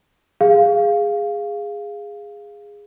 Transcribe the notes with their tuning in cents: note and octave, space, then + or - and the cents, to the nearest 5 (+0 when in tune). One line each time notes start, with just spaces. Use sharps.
G#4 -10 F5 +0